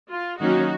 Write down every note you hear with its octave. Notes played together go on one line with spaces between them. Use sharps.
F4
D#3 F#3 A#3 C#4 D#4 F#4